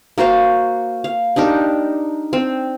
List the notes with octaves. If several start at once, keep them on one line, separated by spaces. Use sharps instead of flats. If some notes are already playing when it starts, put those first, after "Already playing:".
A#3 F#4 C5 F5
F5
D4 D#4 G4 A#4
C4